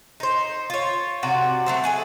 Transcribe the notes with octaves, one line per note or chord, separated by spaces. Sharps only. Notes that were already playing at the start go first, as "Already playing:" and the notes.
D#4 C5
F4 C#5
C3 F#4 D5 F#5
F#3 A3 C4
A3 G#4 F#5